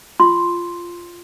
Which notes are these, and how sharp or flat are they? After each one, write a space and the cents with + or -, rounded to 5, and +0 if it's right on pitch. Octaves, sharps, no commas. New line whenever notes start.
F4 -10 C6 +0